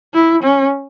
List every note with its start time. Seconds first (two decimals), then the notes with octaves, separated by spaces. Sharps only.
0.14 E4
0.43 C#4